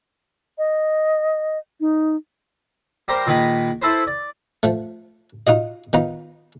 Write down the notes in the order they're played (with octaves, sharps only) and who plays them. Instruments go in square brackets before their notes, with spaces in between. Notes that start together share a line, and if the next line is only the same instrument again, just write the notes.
[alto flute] D#5
D#4
[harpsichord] G3 G4 A#4 C5
A#2 D#3 G#3 B4
E4 A4 B4 C5
D5
F3 A3
D#4 F4 F#4 D#5
D#3 B3 D#4 F4 A#5